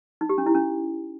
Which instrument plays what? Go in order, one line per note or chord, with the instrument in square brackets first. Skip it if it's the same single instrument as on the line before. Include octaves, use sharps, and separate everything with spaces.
[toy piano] D#4
G4
C#4
E4
C#4